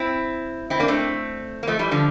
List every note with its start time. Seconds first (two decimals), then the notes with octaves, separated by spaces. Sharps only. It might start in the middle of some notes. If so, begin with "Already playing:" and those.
Already playing: C4 E4
0.70 C4 E4
0.80 A#3 D4
0.88 A3 C4
1.63 A#3
1.67 F3 A3
1.79 E3 G3
1.91 D3 F3